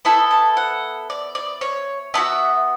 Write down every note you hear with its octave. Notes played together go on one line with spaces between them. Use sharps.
B3 E4 A4 A5
A5
F#5
D5
D5
C#5
B3 D4 F#4 E5